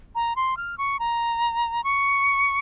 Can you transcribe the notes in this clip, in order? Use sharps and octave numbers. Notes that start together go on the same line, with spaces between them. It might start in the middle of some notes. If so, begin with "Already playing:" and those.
A#5
C6
F6
C#6
A#5
C#6